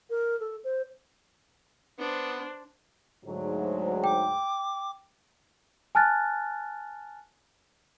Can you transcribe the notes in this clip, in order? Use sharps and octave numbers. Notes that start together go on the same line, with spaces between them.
A#4
A4
C5
B3 D4 C5
D2 G#2 F#3
G5 D6
G#5 A5 F6 F#6 A6